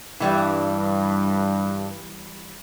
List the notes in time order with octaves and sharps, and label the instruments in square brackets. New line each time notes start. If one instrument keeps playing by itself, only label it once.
[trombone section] G2 [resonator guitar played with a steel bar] E3 G3 E4